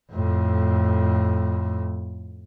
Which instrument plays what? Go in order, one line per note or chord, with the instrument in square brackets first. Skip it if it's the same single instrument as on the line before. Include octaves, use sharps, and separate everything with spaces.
[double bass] F2 A2